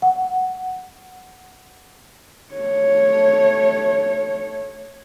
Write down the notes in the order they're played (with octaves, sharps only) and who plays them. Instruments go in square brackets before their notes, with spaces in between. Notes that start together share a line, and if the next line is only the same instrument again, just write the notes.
[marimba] F#5
[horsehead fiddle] A3 C#5